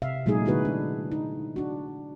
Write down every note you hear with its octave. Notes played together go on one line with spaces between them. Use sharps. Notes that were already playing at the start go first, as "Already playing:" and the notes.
C3 E5 F5
A#2 F#3 G#3 A3 D#4 G#4
D3 B3 D#4 E4 F#4 B4
D4
D#4
D4 F#4